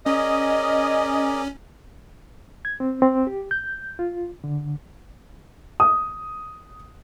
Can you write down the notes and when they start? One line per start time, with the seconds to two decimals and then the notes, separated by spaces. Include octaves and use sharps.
0.06 C#4 G#4 A#4 D5 D#5
2.65 G#6
2.80 C4
3.02 C4
3.27 G4
3.51 G6
3.99 F4
4.44 D3
5.80 D#6